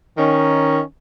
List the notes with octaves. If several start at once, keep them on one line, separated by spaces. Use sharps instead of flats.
D#3 C#4